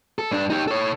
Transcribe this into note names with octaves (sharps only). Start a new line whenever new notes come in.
A4
G2 D4
D#4 G4
A4 C#5